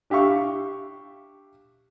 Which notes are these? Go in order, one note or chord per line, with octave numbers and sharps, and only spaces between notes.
D4 G4 E5 F5 C#6